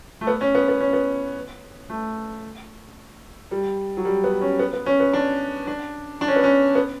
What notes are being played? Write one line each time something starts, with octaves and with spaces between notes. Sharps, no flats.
A3
B3
C#4
B3
B3
C#4
B3
A3
G3
F#3
G3
B3
C#4
B3
B3
C#4
B3
D4
D4
D4
C#4
B3
C#4
B3